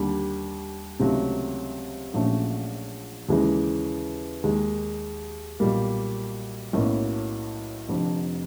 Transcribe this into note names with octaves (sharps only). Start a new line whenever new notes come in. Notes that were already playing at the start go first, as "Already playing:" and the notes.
Already playing: D#2 D3 G3
C#2 C3 D#3 F#3 A3
A#1 A#2 F#3 A3 C#4
D#2 C#3 E3 G#3
D#2 D#3 G#3
B1 A#2 G3 A#3
B1 A2 F#3 A#3 C#4
F1 F2 D3